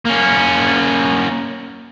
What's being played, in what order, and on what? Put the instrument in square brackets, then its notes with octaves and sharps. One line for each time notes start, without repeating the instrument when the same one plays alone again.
[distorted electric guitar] A#3 C#4